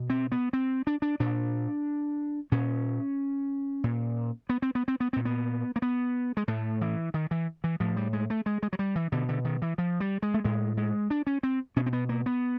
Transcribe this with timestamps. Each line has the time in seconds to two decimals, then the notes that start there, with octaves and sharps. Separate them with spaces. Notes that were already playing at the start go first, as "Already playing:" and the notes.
Already playing: B2
0.10 C4
0.32 B3
0.53 C4
0.87 D4
1.02 D4
1.20 A#2 D4
2.52 A#2 C#4
3.84 A#2
4.49 B3
4.62 C4
4.75 B3
4.88 C4
5.00 B3
5.13 A#2 C4
5.25 B3
5.76 A#3
5.82 B3
6.37 G#3
6.48 A2 A3
6.81 E3
7.14 D#3
7.31 E3
7.64 E3
7.80 A2 F3
7.96 G3
8.13 G#3
8.30 A3
8.46 G#3
8.63 G#3
8.73 F#3
8.79 G3
8.96 E3
9.12 B2 D3
9.29 D3
9.45 D#3
9.62 E3
9.78 F3
10.00 G3
10.22 G#3
10.34 A3
10.45 A2 G#3
10.77 G#3
11.10 D4
11.27 C#4
11.43 C4
11.76 B2 C#4
11.86 C4
11.93 B3
12.09 A#3
12.26 B3